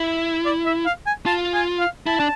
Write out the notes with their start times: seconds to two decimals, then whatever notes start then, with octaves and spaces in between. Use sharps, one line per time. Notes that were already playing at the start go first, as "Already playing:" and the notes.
Already playing: E4
0.45 D5
0.66 E5
0.86 F5
1.06 G#5
1.26 F4 A5
1.54 G#5
1.80 F5
2.06 E4 A5
2.20 D4